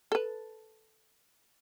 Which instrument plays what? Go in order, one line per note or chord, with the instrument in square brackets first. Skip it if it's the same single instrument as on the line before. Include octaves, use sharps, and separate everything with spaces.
[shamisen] A4 B4